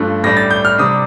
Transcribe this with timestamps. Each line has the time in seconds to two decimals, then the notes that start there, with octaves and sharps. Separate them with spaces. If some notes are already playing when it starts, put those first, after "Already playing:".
Already playing: G2 F3 A3
0.23 A2 G3 D4 A#6
0.37 A6
0.50 G6
0.65 F6
0.78 C3 G3 D4 D#6